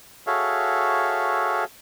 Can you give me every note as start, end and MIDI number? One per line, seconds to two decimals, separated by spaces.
0.27 1.64 66
0.27 1.64 68
0.27 1.64 69
0.27 1.64 73
0.27 1.64 76
0.27 1.64 77